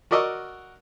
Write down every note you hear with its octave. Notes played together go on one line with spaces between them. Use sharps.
F#4 A#4 D5 D#5 C#6 E6